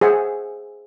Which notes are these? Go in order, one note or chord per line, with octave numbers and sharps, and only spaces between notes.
G#4 C5 E5 F#5